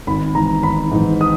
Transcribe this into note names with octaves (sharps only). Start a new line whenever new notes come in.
G#1 B5
G#2 E3 A#5
G#1 B5
G#2 E3
D#6